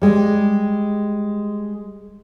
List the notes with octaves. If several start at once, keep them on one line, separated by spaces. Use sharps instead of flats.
G3 G#3